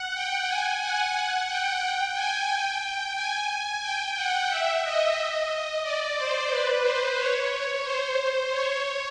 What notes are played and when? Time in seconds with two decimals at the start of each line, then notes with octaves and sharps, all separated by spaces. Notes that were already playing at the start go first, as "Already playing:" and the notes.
Already playing: F#5
0.14 G5
0.48 G#5
0.81 F#5
1.48 G5
2.15 G#5
2.49 G5
3.15 G#5
3.82 G5
4.16 F#5
4.49 E5
4.83 D#5
5.83 D5
6.17 C5
6.50 B4
6.84 C5
7.18 C#5
7.51 C#5
7.84 C5
8.17 C5
8.51 C#5